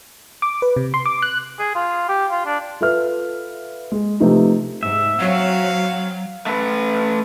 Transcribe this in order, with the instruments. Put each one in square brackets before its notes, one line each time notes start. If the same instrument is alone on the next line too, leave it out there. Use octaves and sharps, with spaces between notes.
[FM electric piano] D6
B4
C3
C6
D6
F#6
[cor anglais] G#4
F4
G4
F4
D4
[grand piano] F4 A4 B4 E5 F6
G#3 G#4
C3 F3 A3 D#4 B4
[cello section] G#2 [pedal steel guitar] E5
[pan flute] F#3 [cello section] C4 F#4 C#5 [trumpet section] F5
[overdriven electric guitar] A3 B4